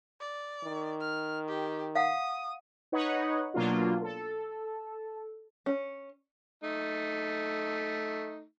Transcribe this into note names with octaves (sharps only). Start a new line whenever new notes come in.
D5
D#3
F6
G4
F5 F#5 D#6
D#4 B4 C#5 D#5 F#5
B2 F#3 A#3 D4 F4
A4
C#4
A3 D#4